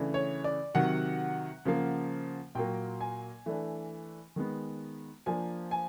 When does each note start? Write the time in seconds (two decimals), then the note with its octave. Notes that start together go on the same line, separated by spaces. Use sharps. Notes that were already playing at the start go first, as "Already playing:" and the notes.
Already playing: C#3 E3 A3 D4
0.14 C#5
0.44 D5
0.74 C3 D#3 F#3 F#5
1.65 C#3 F3 A#3
2.55 A#2 F#3 A#3 G5
3.01 G#5
3.46 E3 A3 D4
4.36 D#3 G#3 B3
5.26 F3 A#3 D4 G#5
5.71 G#5